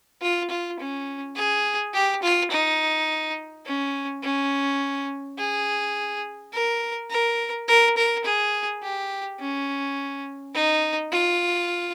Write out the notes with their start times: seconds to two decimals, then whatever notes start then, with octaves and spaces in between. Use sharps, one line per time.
0.22 F4
0.50 F4
0.79 C#4
1.36 G#4
1.94 G4
2.22 F4
2.51 D#4
3.66 C#4
4.23 C#4
5.38 G#4
6.53 A#4
7.11 A#4
7.68 A#4
7.97 A#4
8.25 G#4
8.83 G4
9.40 C#4
10.54 D#4
11.12 F4